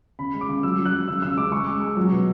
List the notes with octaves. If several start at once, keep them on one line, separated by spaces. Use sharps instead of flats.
C#3 B5
G#3
D6
C#3
F#3 E6
F#3
F#6
F#3
C#3 E6
C#3 E6
G#3 D6
G#3 C#6
G#3
G#3
F#3
B2